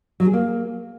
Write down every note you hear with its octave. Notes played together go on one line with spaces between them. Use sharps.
F#3
G#4
A#3